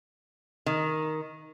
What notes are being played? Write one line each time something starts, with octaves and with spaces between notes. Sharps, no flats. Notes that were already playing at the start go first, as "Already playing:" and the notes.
D#3